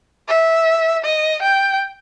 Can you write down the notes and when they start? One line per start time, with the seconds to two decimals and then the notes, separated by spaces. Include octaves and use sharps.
0.28 E5
1.04 D#5
1.42 G5